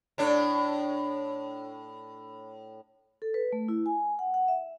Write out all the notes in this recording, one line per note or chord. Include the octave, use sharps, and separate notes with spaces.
A2 D4
A4
B4
A3
E4
G#5
F#5
F#5
E5